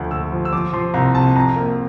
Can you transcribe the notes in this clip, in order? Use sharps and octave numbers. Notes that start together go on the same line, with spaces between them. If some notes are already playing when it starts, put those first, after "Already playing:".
Already playing: D2 F3
D2 E6
F3
E6
F3 D6
F3 C6
C2 A#5
C3 A5
F2 A#5
A#3